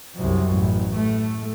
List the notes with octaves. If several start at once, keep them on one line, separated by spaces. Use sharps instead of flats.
C2 F#2
A1
A2 A3